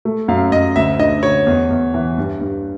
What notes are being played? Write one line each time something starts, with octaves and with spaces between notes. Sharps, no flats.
A3
F#2 F5
F#2 D#5
D2 E5
D3 D#5
D3 C#5
E2
E2
E3
G2
G2